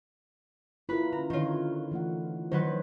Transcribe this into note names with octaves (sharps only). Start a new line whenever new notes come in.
E4 F4 A#4 B4 B5
D3 C#4 A#5
D3 D#3 E4 F4 C#5
E3 A3 F#5
D#3 F#3 B4 C5